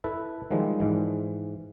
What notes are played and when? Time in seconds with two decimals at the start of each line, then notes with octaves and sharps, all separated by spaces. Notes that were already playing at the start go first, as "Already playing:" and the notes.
0.04 E4 A4 B4 E5
0.51 D#3 F3 G3 G#3
0.80 G#2 E3